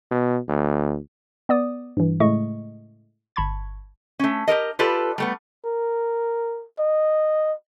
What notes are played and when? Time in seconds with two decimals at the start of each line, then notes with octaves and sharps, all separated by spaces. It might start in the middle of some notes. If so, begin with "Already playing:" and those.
0.11 B2
0.48 D2
1.49 B3 D5 D#6
1.97 G2 E3
2.20 A2 C#3 G#3 A3 D#5 C#6
3.36 G1 A5 B5 C#6 G#6
4.19 A3 C#4
4.48 G4 A4 A#4 D#5
4.79 F4 G4 A4 B4 D5
5.18 G3 A3 B3
5.65 A#4
6.79 D#5